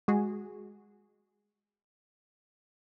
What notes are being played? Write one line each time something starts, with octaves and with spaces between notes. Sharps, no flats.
G#3 F#4 G#4